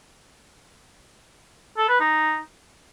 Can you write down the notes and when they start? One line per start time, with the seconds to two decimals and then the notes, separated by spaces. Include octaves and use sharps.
1.77 A4
1.89 B4
2.00 D#4